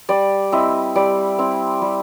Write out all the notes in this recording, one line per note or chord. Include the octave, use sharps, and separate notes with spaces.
G3 D5
C4 E4 D#5
G3 D5
C4 E4
G3